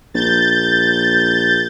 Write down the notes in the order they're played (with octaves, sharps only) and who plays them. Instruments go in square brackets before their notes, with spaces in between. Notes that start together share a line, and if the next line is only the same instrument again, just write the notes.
[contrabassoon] A#1 [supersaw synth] G6 A6